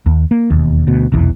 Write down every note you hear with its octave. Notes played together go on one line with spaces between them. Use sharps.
D#2
A#3
E1 D#2
D2 B2
F1 B1 E2 E3